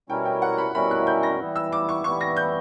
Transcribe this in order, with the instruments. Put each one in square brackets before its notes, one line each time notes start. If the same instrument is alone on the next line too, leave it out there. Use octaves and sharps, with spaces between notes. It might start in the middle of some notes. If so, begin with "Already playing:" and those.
[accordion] B2 G3 C#4 E4 A#4 [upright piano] G5
[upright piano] G5
F#5
B5
[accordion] B2 G3 C#4 E4 A#4 [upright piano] B5
[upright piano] F#6
G6
A#6
[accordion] E3 G3 B3 E4
[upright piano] E6
D6
C#6
[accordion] E3 G3 B3 E4 [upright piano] C#6
[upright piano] A#6
G6